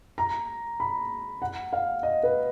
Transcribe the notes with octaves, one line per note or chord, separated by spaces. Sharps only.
A#5
B5
F#5
F5
D#5
B4